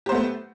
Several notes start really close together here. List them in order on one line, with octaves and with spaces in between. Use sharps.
G4 C5 B3 A3